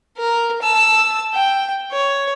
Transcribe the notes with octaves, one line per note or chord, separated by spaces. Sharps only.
A#4
A5 E6
G5
C#5